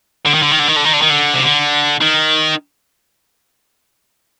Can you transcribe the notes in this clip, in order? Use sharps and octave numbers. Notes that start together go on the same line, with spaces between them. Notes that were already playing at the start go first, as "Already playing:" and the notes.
D3
D#3
D3
D#3
D3
D#3
D3
D#3
D3
D#3
D3
C3
D3
D#3